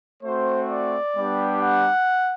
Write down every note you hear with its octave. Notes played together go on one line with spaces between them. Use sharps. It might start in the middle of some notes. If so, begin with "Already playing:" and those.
A3 C4 F#4 C5
D5
G3 B3 D4 G4
F#5